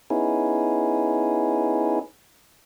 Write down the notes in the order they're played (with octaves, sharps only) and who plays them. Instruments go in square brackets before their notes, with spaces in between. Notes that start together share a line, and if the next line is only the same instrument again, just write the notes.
[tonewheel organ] B3 C#4 D#4 E4 G#4